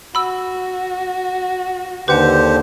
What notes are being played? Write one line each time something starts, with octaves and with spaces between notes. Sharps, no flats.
F#4 B5 E6
D#2 D3 G4 B4 C5 F#5